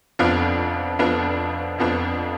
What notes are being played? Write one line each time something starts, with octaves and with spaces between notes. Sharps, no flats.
F1 F2 F3 B3 D4
F1 F2 F3 B3 D4
F1 F2 F3 B3 D4